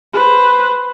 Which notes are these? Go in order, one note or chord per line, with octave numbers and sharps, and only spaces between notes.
B4 C5